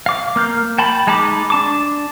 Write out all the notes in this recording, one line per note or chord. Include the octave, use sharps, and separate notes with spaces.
F5 D6
A#3 F6 G6
G5 A5 B5
G#3 D#4 A5 B5 D6
D4 A5 D6